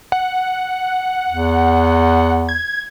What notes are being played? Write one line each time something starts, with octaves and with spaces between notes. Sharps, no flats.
F#5
E2
G#6